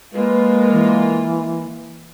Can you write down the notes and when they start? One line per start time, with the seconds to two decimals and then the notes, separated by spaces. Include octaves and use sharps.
0.14 G#3 A#3 F4 B4
0.72 E3